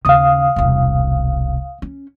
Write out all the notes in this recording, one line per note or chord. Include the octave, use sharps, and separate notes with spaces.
D#2 C#3 F5 D#6
E1 C2
C#4